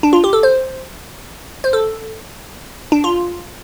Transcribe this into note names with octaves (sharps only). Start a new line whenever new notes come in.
D4
F4
G4
A4
C5
C5
A4
D4
F4